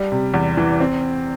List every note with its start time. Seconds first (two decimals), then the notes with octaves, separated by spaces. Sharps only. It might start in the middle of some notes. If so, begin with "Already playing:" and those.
Already playing: G3
0.12 C3
0.34 E2
0.57 E3
0.80 C4